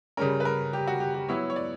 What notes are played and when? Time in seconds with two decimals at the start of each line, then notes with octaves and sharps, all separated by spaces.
0.17 C#3 G3 C#4 A#4
0.40 B4
0.45 A#4
0.73 G4
0.87 F#4
1.00 G4
1.14 G4
1.29 F#3 B3 E4 C#5
1.50 C#5
1.56 D5